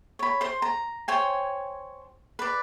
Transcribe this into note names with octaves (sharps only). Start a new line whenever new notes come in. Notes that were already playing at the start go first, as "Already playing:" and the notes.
C#5 B5
C5 C6
A#5
C5 C#5 G5 G#5
B4 D5